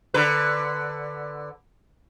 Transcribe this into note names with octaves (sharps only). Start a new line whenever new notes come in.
D3 B4